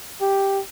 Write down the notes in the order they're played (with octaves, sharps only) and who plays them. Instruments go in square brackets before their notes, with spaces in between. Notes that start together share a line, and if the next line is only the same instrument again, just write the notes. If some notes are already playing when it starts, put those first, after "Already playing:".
[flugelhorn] G4